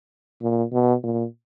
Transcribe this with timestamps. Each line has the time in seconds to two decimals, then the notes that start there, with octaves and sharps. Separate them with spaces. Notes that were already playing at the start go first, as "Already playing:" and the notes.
0.42 A#2
0.73 B2
1.03 A#2